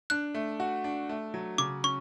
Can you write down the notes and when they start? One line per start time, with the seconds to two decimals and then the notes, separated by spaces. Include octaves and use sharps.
0.10 D4 F#6
0.34 A3
0.60 F#4
0.84 D4
1.09 A3
1.34 F#3
1.58 C#3 D6
1.84 C#4 C#6